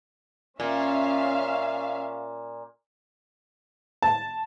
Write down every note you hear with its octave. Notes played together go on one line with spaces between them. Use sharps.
A#2 C#4 E5 F5
A5